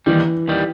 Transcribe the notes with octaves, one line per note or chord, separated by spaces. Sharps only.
D#2 D#3 E3 G3
D#2 D#3 G3